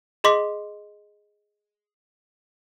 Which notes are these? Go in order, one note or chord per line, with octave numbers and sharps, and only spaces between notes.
G#4 D#5 C6 D6 B6